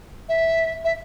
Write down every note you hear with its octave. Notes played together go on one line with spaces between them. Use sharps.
E5
E5